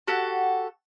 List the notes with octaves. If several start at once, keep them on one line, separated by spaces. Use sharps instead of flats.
F#4 G4 A4 F#5